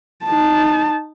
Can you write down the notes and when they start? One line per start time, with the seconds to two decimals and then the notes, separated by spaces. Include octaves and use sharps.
0.25 D#4 A5